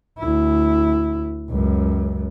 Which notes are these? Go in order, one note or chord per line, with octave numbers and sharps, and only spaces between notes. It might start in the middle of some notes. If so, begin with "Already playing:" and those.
D2 E4
C#2 F#2